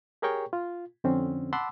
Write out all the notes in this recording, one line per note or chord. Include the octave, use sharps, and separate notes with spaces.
G4 G#4 A#4 C#5 G5 C#6
F4
F2 D3 C4 C#4
F#5 A5 B5 C6 D6 E6